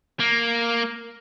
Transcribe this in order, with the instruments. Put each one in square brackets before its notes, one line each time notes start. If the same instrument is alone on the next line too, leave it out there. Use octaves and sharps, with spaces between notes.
[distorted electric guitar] A#3